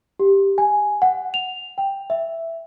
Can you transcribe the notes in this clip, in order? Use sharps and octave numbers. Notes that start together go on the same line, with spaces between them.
G4
G#5
F#5
F7
G5
E5